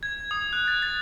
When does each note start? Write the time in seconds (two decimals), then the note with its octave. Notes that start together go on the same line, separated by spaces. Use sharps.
0.03 G#6
0.31 D#6
0.53 F#6
0.68 A6
0.82 A6